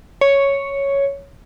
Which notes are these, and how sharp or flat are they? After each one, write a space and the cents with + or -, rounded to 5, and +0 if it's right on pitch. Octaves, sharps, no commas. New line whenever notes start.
C#5 +0